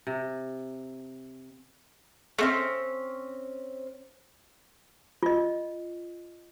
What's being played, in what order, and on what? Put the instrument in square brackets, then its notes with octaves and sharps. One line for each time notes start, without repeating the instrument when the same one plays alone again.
[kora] C3
[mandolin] A3 C4 C#4
[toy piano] F4 D#5